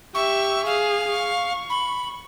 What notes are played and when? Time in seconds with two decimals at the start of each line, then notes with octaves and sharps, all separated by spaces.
0.15 G4 E5 C#6
0.66 G#4 F5
1.10 C#6
1.70 B5